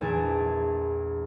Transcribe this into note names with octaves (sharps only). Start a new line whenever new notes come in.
A#1 E2 A5 G#6 D7 E7